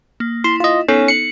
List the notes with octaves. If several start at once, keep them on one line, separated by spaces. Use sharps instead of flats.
A#3
E4 C6
F4 D#5
B3 C#4 D#4 A4
C7 C#7 F#7